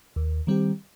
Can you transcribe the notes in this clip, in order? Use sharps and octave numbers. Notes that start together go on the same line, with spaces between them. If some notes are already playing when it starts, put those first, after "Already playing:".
D#2
D#3 G3 C4 G4